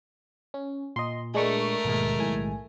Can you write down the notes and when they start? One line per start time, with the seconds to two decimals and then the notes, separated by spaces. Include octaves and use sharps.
0.54 C#4
0.96 A#2 D#5 C6
1.35 G#3 A3 D4 A#4 C#6
1.85 G#1 D#2 B2 D#3 G#3
2.19 B1 A2 G#5